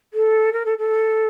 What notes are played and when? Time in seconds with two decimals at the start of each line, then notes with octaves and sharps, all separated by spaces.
0.13 A4
0.52 A#4
0.65 A4
0.78 A4